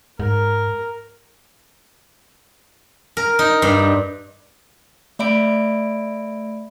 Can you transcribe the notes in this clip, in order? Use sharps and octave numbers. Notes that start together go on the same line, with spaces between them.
G#2 A#4
A#4
D#4
G2
A3 D5 E5 B5 D7